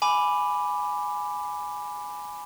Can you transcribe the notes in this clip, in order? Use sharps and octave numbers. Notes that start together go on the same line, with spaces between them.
G#5 B5 D6